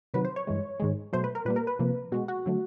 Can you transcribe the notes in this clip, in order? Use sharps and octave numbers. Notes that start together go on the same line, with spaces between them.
C3 D#3 F#3 B4
C5
C#5
G2 E3 G#3
G#2 D#3 G#3
B2 F#3 A3 C5
B4
A#4
A#2 G3 A#3 B4
A#4
B4
C3 F3 A#3
B2 G#3 F#4
F#4
D3 F#3 A3